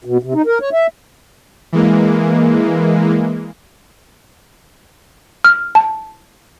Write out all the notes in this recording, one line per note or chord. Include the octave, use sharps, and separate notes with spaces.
B2
C3
D#4
A#4
C#5
E5
E3 G#3 A#3
F6
A5